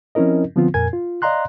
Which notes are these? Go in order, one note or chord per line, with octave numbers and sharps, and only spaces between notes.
F3 C4 C#4 E4 A#4 D#5
D3 F3 B3 C4 F4
F2 A#2 A#4 G#5 G#6
F4
D5 D#5 F5 A#5 C6 F#6